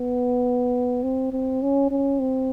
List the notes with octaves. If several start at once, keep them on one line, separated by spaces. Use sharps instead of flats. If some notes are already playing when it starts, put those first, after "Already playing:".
Already playing: B3
C4
C4
C#4
C#4
C4